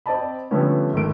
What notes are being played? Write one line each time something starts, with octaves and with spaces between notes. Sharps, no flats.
C4 D5 D#5 A5 B5
D3 F3 G3 A3 B3 C#4
G#1 A3 D7